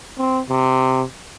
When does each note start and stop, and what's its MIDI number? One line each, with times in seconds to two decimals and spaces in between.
0.18 0.41 60
0.49 1.05 48